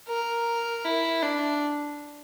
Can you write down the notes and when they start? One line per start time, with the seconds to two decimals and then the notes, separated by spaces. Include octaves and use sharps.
0.08 A#4
0.85 E4
1.23 D4